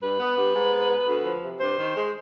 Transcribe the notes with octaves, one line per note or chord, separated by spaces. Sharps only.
G2 B4
B3
G2
G#2
B3
B3
D2
F3
C3
G2 C5
D#3
G#3